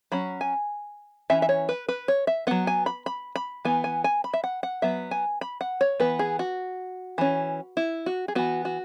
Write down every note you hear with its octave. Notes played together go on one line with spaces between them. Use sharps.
F#3 C#4 B5
G#5
E3 C#4 E5
E5
C#5
B4
B4
C#5
E5
F#3 B3 F#5
G#5
B5
B5
B5
E3 B3 G#5
G#5
G#5
B5
E5
F#5
F#5
F#3 B3 E5
G#5
B5
F#5
C#5
E3 B3 B4
G#4
F#4
E3 C#4
E4
F#4
G#4
E3 B3 F#4
F#4